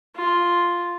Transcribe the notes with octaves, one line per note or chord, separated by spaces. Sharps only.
F4